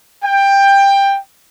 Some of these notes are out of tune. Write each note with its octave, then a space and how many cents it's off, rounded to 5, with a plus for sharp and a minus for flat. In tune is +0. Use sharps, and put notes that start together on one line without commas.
G5 +15